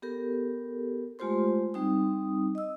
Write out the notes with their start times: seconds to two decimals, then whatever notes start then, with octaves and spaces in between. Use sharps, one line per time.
0.02 B3 G4 A4 A#4
1.19 G#3 A3 F4 G4 C5 C6
1.74 G3 C4 D#4 D#6
2.55 D#5 E6